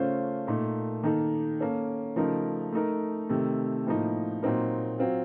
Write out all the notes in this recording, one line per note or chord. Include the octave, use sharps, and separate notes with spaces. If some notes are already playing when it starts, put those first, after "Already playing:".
Already playing: C#3 A3 C#4 F4 C5
A#2 A3 D#4
D#3 A#3 D#4 A4
A#3 C#4 A4
C#3 F3 A3 D#4 A#4
A3 D#4 A#4
C3 D#3 A3
A2 F3 A#3 D#4
A#2 F#3 C4 D#4 A#4
F#3 C4 F4